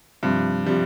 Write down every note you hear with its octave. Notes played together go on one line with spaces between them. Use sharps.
G2 C3 F3
C3 F3 G3